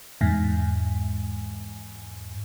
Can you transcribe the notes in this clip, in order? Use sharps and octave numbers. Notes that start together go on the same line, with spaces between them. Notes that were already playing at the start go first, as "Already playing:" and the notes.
E2 G#2